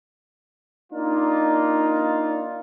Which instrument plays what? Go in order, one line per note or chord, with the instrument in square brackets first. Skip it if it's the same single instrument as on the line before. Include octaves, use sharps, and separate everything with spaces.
[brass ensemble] A#3 D4 D#4 F4